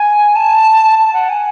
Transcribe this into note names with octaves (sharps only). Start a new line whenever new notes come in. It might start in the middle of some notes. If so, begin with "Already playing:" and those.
Already playing: G#5
A5
A5
F#5
G#5